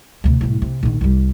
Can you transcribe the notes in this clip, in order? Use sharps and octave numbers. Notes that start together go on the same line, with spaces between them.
D2 C3
C2 A2
C3
A#1 D#3
C2 G3